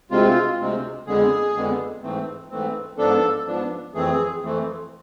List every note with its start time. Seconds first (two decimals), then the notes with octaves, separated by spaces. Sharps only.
0.10 D2 C3 G#3 C4 F4
0.59 D2 C3 G#3 C4
1.06 F2 D3 G#3 B3 G#4
1.54 F2 D3 G#3 B3
2.03 G#2 E3 A3 C4
2.50 G#2 E3 A3 C4
2.98 G#2 F3 B3 D4 A4
3.46 G#2 F3 B3 D4
3.94 F2 E3 A3 C4 G#4
4.42 F2 E3 A3 C4